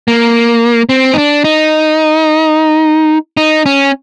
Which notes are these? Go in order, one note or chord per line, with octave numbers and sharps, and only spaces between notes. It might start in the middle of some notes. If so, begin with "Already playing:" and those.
A#3
C4
D#4
D4
D#4
D#4
C#4